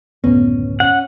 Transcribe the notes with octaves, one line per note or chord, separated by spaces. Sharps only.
F#1 D2 A2 B3 C#4
C#4 F#5